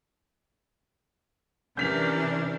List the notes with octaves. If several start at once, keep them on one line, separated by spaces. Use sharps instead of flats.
C3 E3 C#4 D4 A#4 G6 B6 F7